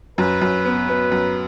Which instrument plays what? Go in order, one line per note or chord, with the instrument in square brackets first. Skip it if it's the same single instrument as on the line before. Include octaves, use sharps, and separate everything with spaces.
[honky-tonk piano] F#2 [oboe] B4
[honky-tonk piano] F#2
B3
B3
F#2